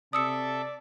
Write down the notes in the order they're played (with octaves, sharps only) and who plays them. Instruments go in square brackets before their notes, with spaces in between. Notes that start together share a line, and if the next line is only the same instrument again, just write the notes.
[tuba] C3 [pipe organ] A4 E5 [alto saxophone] D5 [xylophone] D#6 E6 C#7